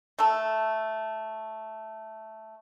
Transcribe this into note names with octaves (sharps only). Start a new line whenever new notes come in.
A3 A4